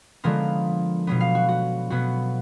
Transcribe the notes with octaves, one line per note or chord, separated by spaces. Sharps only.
D3 F3 G#3 B3 A#4
B2 F#3 B3
F5
F#4
F#4
B2 F#3 B3 F#4